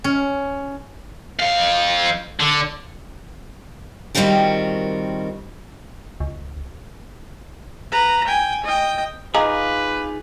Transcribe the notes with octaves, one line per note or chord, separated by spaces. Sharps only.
C#4
F2 F5
D3
D#3 G3 C4 F4 F#4 A#4
C#2
B4 A#5
G5 G#5
D#5 G5
D#4 F4 G#4 B4 D#5 F5 A#5 D6